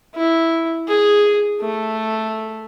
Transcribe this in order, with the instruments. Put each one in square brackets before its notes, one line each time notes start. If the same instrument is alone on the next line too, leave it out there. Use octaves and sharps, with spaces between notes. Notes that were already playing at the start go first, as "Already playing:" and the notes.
[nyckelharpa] E4
G#4
A3